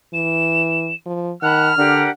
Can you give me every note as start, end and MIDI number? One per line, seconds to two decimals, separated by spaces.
0.14 0.91 52
0.14 0.95 100
1.06 1.32 53
1.43 1.72 51
1.43 1.74 78
1.43 1.74 81
1.43 1.74 83
1.43 2.05 89
1.43 1.66 90
1.78 2.05 50
1.78 2.10 62
1.78 2.10 67
1.78 2.10 70
1.78 2.11 78